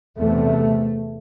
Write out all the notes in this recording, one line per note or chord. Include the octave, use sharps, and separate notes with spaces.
E2 C3 A3